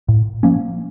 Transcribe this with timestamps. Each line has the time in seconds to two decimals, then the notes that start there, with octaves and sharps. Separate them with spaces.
0.08 A2
0.43 F3 A#3 C#4